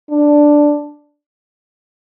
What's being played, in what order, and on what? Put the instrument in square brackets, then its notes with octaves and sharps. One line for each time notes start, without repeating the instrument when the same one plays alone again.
[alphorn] D4